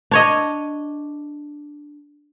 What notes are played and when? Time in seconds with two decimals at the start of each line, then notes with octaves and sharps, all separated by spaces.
0.11 D4 C#5 D#5